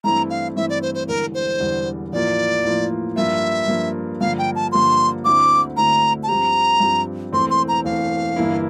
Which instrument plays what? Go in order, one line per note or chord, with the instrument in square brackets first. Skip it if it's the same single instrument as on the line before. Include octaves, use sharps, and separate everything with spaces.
[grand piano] G2 E3 A3 C4 E4 [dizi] A#5
[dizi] F5
[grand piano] G2 E3 A3 C4 E4 [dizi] E5
[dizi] D5
C5
C5
[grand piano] E1 E2 D3 G3 [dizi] A#4
[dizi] C5
[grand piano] E1 E2 D3 G3
[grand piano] A1 A2 F3 A#3 F4 [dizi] D5
[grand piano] A1 A2 F3 A#3 F4
[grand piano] G2 F3 A#3 F4 [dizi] E5
[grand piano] G2 F3 A#3 F4
[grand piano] G2 D3 F3 A#3 [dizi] F5
[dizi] G5
A5
[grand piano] G2 D3 F3 A#3 [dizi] C6
[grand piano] D2 D3 A3 C4 E4 [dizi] D6
[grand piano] D2 D3 A3 C4 E4 [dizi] A#5
[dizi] A5
[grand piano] G2 F3 C4 G4 [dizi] A#5
[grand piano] G2 F3 C4 G4
[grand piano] E1 E2 E3 A3 C4 [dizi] C6
[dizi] C6
A#5
[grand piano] E1 E2 E3 A3 C4 [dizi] F5
[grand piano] G1 G2 E3 A#3 E4